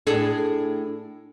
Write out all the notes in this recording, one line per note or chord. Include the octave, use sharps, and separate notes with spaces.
A2 D4 G#4 A4